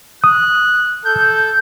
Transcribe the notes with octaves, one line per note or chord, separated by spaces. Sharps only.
D#6 F#6
A4 G6